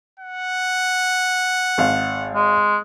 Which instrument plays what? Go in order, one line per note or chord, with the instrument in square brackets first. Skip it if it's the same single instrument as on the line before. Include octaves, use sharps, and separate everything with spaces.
[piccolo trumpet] F#5
[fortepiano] G#1 F5
[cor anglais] G#3